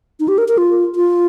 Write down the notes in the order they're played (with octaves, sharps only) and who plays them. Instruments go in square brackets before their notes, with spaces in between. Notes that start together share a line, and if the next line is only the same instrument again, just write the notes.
[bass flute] D#4
G4
A#4
A#4
F4
F4